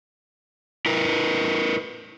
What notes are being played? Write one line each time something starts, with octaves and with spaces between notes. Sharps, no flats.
E4 A#4 B4